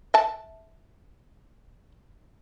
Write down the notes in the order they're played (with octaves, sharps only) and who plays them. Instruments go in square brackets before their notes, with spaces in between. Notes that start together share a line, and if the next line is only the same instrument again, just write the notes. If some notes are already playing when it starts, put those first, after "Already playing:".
[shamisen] E5 A5